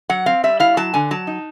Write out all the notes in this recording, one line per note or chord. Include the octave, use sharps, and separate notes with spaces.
F#3 F#5
C4 F5
G3 E5
E4 F5
F#3 A5
D3 G#5
F#3 A5
D#4